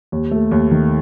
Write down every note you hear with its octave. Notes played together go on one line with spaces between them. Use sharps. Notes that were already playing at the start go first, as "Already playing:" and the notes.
D#2
A3
D#2
D#3